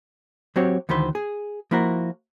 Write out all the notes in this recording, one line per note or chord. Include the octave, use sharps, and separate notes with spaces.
F#3 C4 F#4 G4 C#5
D2 D#3 E3 B4 C5
G#4
F3 A#3 E4 F#4 A#4